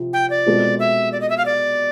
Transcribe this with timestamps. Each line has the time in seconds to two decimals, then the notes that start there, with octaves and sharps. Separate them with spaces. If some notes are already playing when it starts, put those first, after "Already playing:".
Already playing: C3 F3
0.13 G5
0.30 D5
0.46 B2 G#3 C4 F4 A4
0.79 E5
1.12 D5
1.21 D#5
1.30 E5
1.38 F5
1.46 D5